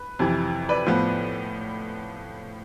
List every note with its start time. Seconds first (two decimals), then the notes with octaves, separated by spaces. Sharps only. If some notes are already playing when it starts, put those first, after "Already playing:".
Already playing: B4
0.19 F2 C3 E3
0.69 B4 D5
0.86 A2 F3 B3